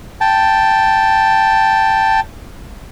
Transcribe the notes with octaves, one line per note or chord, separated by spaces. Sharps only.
G5 A5